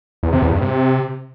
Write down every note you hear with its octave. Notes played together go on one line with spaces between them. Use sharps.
E2
C3
E2
G2
C3